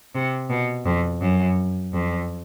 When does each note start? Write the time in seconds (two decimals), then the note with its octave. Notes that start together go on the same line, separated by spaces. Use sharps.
0.15 C3
0.50 B2
0.85 F2
1.22 F#2
1.93 F2